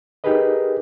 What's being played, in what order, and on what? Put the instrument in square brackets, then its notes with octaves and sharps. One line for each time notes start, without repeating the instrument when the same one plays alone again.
[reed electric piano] D#4 G4 G#4 A#4 B4 D#5